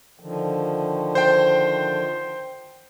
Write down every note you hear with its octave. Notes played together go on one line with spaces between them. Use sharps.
D3 D#3 F3
C5 G5